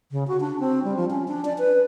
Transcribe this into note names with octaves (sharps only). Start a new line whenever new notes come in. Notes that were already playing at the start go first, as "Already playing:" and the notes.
C#3
F#4
D4
C4
G3
F3
C#4
D4
D5
B4